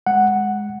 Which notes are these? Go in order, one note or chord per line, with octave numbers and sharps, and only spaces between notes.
G#3 F#5